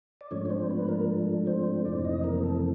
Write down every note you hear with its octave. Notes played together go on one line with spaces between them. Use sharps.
D5
G#2 F3 A3 C#4 D4 C#5
C#5
C4 C5
B3 B4
A#3 A#4
C4 C5
F2 C3 E3 A3 C4 D4 D5
D#4 D#5
A#3 A#4
A3 A4